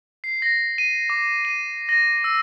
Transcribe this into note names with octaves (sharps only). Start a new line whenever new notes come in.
C7
A#6
D#7
D6
D#7
A#6
E6